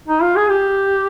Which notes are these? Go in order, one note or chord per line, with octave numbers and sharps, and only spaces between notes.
D#4
F4
G#4
G4